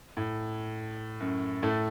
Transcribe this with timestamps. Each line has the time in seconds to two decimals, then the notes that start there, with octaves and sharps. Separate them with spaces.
0.17 A2
1.20 F#2
1.63 A2 A3